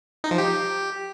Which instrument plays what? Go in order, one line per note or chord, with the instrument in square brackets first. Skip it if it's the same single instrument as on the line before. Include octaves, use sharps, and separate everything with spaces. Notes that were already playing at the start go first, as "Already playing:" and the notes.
[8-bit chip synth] D#4
F3
G4